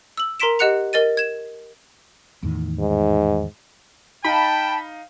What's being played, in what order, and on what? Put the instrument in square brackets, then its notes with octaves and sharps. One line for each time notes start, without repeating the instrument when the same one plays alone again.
[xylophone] E6 F#7
A#4 A#5 C6 B6 D7 E7
G4 D#5 F#5 F#6 C#7 F7
A#4 D#5 A6 D#7
G#6 E7
[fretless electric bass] E2 A2 D#3
[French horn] G#2
[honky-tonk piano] D#4 F5 [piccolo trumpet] G5 [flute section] A5 [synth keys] B5